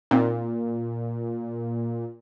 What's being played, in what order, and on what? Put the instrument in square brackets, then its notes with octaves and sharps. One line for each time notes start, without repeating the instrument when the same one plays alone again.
[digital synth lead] A#2 [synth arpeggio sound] C4 D#4